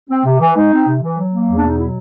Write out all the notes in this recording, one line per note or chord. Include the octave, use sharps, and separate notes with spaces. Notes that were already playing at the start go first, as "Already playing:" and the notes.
C4
C3
E3
G#3 D#4
C4
C3
E3
F#3
A#3
E2
D4
B2 D#4
F#3 E4